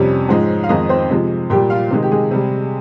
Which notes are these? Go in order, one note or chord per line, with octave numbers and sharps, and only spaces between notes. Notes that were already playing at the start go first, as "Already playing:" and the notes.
Already playing: F2 C3 G3 C#4
G#2 F3 G#3
F5
F2 D#3 G#3 D#4 D#5
C4 C5
C3 F3 G#3
A#2 G3 G4 G5
F4 F5
C3 D#3 G#3
G4
G#3 G#4
C3 G3